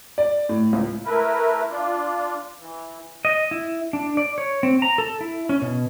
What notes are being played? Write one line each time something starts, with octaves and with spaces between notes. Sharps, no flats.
D5
A2
C#2
A3 E4 A#4 B4
D4 F4
E3
D#5
E4
D4
D5
C#5
C4
A#5
A4
E4
C#4
B2